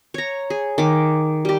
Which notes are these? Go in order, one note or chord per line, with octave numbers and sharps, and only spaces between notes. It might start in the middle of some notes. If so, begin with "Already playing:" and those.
C#5 A#5
G#4
D#3 D6
G3 G4